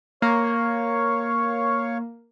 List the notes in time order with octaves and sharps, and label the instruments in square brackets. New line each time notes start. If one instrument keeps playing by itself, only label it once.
[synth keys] A#3 [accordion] C#5 F5 C#6